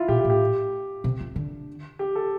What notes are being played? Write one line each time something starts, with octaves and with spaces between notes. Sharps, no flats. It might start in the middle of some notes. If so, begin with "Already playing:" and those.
Already playing: E4 F4
A#2 G4
G4
A2
G4
C3
F2
D3
G4
A4